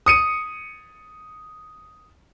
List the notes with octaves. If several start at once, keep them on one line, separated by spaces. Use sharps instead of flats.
D#6 C#7 D#7